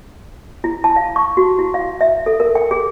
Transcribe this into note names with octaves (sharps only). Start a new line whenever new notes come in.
E4
A5
F5
C#6
F#4
E4
F5
E5
A4
A#4
G5
G#4